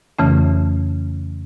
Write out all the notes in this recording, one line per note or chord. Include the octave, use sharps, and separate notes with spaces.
F2 C#3 E3 A3 C#4